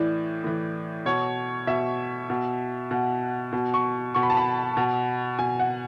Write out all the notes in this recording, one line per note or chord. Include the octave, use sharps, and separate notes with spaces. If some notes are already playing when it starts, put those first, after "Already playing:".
Already playing: A2 E3 D5
A2 E3
B2 C#5
B2 E5
B2
B2 F#5
B2
C#6
B2 C#6
B5
A5
B5
B2
B2 G#5
F#5